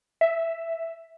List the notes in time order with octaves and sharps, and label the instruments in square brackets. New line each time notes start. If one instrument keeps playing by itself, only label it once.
[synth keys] E5